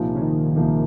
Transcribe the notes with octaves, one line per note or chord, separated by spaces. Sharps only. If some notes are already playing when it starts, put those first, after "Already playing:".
Already playing: C2 A#2 F3 A#3 D#4
C#3
D#3
C2 A#2 F3 A#3 D#4